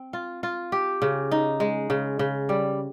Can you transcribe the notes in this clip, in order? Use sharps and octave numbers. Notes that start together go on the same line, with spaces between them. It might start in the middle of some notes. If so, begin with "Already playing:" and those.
Already playing: C4
F4
F4
G4
C#3
D#4
G#3
C#3
C#3
G3